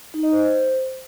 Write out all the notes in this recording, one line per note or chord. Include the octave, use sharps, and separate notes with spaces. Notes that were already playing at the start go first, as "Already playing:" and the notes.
D#4
D#5
C5